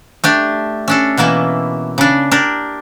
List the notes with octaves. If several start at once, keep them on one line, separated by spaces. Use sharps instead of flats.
A3 D4 G4
C#4 D4 A4
B2 E3 A#3 E4
C#3 D4
D4 G4 A#4